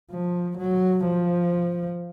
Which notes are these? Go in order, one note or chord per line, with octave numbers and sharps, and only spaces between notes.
F3
F#3
F3